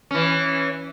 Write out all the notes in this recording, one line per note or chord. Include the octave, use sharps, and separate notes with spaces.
E3 C#4